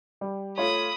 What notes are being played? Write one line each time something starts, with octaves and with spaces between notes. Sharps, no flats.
G3
A3 F4 C#5 B5 D#6